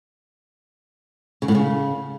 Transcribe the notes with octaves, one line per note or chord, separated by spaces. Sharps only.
C#3
A2
C#3